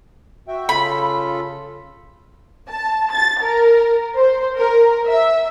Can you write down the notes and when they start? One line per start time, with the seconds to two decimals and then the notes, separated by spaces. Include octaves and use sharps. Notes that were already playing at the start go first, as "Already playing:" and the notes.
0.48 F#4 E5 G5
0.69 C#3 F4 A4 B5
2.69 A5
3.12 A6
3.43 A#4
4.16 C5
4.57 A#4
5.07 E5